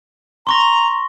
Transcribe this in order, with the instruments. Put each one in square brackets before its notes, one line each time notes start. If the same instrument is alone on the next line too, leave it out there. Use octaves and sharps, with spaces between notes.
[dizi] A#5 [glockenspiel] C6 C#6 A#6